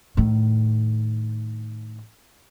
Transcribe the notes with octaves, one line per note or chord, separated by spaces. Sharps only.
A2 D#3